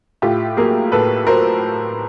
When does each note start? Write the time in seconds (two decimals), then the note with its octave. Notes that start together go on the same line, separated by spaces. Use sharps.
0.22 A2 F4 G4
0.57 F#3 A#3 G#4 A#4
0.92 A2 A4 B4
1.27 F#3 A#4 C5